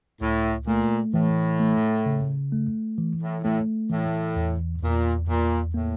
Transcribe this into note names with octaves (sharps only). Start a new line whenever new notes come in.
C#2 A2
A#2 A3
A2 E3
A3
C#3
A3
E3
A2
A2 A3
A2 E3
E2
E2 A#2
E2 A#2
A2 A#3